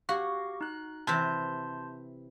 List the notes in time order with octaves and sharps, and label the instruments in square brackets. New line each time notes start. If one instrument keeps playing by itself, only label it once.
[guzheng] F#4 [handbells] G4 F5 C#6
[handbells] D#4 F#6
[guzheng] C3 E3 [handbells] A5 C6 G6